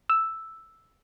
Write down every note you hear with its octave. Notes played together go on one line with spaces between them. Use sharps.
E6